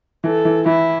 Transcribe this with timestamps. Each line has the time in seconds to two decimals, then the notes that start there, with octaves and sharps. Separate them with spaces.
0.24 E3 A4
0.45 E3
0.66 E3 E4